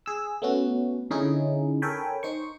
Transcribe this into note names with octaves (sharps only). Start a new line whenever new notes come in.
G#4 E6
A3 B3 C#4 F#4
D3 C#4 D#4 E4 G#4
A4 A#4 C#5 G5 G#5 B5
D#4 C5 C#6